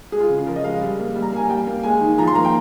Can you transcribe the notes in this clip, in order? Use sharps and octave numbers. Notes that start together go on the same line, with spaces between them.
G#3 G#4
F4
C#3
G#4
F3 A#4
D#5
G#3 F5
G3
A#3
G3
A#5
A#3 G#5
G3 G5
A#3
G#3 G#5
D#3
F3 A#5
C6
A#3 A#5
G5